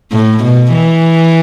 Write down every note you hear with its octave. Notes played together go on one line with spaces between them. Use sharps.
A2
B2
E3